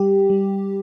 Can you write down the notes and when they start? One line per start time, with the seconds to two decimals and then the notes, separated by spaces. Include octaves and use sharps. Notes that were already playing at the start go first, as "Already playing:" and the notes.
Already playing: G3 G4
0.30 G3